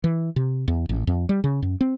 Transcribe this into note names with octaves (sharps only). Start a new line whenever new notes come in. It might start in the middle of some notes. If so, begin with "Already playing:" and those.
E3
C3
E2
A1
F2
G3
C#3
F#2
C4